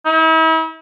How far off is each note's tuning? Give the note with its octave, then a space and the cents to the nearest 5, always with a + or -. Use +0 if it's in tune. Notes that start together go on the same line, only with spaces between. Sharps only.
E4 -45